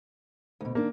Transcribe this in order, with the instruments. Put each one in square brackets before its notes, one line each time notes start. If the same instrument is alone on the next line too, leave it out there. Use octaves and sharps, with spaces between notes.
[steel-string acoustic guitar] D2 B2
[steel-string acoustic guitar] D#3 D4 [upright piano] A#3